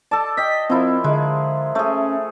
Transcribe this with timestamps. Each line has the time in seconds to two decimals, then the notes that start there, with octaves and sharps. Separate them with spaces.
0.11 A4 D5 A5
0.37 D#5 G5 B6
0.70 F3 C4 E4 A#4
1.04 D3 G#3
1.75 A3 C#4 G#4